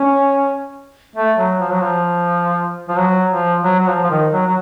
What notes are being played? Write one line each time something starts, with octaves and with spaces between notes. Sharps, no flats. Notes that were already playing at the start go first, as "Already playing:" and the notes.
Already playing: C#4
A3
F#3
F3
F#3
F3
F3
F#3
F3
F#3
F#3
F3
F3
D#3
F#3
F#3